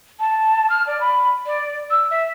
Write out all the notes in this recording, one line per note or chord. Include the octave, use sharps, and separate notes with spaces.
A5
F6
D5
B5
D5
E6
E5